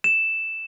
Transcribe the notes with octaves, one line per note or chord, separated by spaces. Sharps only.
E7